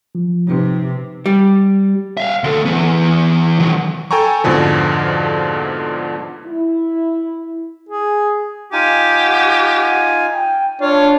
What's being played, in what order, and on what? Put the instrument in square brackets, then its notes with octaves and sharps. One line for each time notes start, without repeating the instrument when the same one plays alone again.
[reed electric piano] F3
[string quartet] C3 [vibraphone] D#4 G4 B4
[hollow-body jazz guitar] G3
[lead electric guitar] E5 F5
D2 A4
E3 B3
D#3 F#3
[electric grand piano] A4 G5 G#5 A#5 C#6
F2 G#2 B2 D3 F3
[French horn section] E4
[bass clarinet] G#4
[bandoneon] D#4 F4 G#5 [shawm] G4
[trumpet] F#5
G5
[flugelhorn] D4 [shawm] F4 [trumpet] C#5